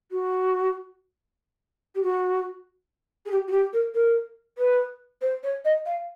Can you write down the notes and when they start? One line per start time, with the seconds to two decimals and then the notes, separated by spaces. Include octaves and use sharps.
0.11 F#4
1.95 G4
2.03 F#4
3.26 G#4
3.31 G4
3.47 F#4
3.51 G4
3.73 A#4
3.94 A#4
4.58 B4
5.21 C5
5.43 C#5
5.65 D#5
5.86 F5